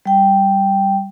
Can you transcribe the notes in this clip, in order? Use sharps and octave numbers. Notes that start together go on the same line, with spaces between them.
G3 G5